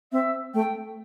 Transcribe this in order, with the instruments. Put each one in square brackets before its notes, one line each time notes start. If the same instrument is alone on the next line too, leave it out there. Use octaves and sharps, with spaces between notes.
[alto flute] C4 [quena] E5
[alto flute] A3 [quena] G5